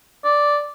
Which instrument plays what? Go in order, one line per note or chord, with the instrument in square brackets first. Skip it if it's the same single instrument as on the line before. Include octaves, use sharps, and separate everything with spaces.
[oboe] D5